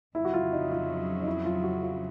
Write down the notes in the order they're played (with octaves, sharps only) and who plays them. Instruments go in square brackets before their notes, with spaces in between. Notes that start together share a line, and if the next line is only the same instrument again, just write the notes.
[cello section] F2 C#3 F#3 [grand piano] E4
[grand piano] F#4
F4
D#4
F4
D#4
E4
F4
F#4
F4